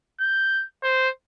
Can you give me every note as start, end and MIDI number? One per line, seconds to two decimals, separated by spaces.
0.21 0.66 91
0.84 1.09 72